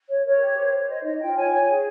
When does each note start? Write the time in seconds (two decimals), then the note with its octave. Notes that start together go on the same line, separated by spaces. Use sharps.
0.09 C#5
0.25 A#4 C#5
0.40 G4
0.56 C5
0.72 C5
0.88 C5 D#5
1.04 D#4 D#5
1.20 F4 G5
1.36 C#5 G#5
1.52 C#5
1.68 G#4